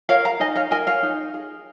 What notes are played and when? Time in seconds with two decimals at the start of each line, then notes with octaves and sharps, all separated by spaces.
0.09 A#4 C#5 F5
0.25 F5 A#5
0.40 D#4 D#5 G#5
0.56 C#5 F5
0.71 A#4 D#5 G#5
0.87 C#5 F5
1.03 D#4
1.34 G#4